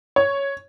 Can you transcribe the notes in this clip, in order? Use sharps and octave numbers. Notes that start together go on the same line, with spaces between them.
C#5